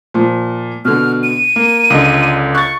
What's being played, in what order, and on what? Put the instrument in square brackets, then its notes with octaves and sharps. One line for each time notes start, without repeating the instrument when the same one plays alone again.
[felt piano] A#2 F3
[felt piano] B2 D3 [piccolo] F6
[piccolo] D#7
[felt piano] A#3
[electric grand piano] C#2 D3 [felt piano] D#5
[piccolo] C#6 [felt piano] F#6 A6